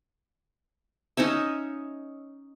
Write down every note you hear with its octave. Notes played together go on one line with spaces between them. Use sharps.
C#4 D#4 C#5 E5